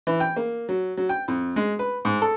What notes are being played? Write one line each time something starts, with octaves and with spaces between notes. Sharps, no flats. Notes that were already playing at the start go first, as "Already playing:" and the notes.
E3
G5
A#3
F#3
F#3
G5
F2
G#3
B4
G#2
A4